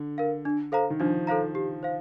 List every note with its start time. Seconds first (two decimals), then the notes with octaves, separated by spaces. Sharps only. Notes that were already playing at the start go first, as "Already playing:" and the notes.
Already playing: D3
0.18 A#4 F5
0.45 D4
0.72 A4 C5 F5 A#5
0.90 D#3
1.00 F3 D4
1.27 A4 C5 F5 A#5
1.55 G4
1.83 C5 F5